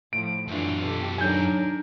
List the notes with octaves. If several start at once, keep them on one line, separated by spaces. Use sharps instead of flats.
A2 F3 D7
F#2 E3 F#3 D4 F4
B2 G4 A4
D#3 F#3 D4 A#4 G#5 G6